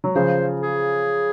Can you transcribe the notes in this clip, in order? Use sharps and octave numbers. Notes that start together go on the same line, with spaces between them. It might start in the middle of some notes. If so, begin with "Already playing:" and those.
F#3
C#3 F3 C5
G#4